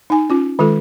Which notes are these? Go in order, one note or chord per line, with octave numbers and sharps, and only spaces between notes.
D#4 G#5
C#4 F4
D#3 G#3 F4 A4